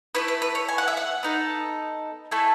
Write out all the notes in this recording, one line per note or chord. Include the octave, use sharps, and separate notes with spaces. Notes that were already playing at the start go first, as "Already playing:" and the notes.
A3 C#4 E4 B4
B4
B4
C#5
G#5
F#5
E5
F#5
B3 D#4 A4
A3 E4 A4 G#5